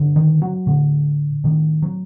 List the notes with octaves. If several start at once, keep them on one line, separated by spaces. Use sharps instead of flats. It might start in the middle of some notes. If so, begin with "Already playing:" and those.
Already playing: G2 D3
D#3
F#3
A2 D3
A2 D#3
F#3